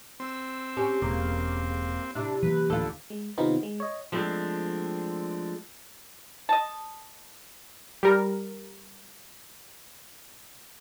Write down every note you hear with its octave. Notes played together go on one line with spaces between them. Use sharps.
C4 E6
C#4 G4
E1 C#3 A#3
C3 D4 E4
E3 F#3 A#3 B4
D2 F4 A4
G#3
C3 D#3 B3 C4 D#4 F4
G#3
C#5 D#5
F3 G#3 A3 C4 D4
D#5 A5
G3 A#4